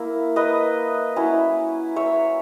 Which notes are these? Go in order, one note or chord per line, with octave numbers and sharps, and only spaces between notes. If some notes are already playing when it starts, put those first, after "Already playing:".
Already playing: A#3 E4
B4 D#5
F#3 C#4 E4
C#5 E5